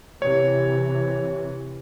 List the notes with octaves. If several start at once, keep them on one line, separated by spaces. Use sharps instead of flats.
C3 E3 C#5